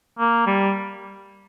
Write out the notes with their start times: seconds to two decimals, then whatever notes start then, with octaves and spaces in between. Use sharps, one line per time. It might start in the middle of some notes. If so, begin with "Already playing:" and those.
0.19 A#3
0.47 G3